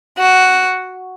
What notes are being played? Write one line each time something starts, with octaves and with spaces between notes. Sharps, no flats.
F#4